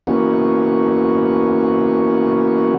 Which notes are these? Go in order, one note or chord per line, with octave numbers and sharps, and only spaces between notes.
E3 A#3 B3 C#4 F#4